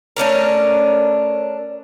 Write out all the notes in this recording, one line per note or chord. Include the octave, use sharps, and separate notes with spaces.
A3 C#4 D4 A#4